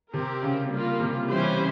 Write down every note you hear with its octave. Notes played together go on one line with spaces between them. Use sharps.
C3 C4 G4 A#4
C#3
G3 A#3 F4
C3
E3 G3 C#4 G4 C5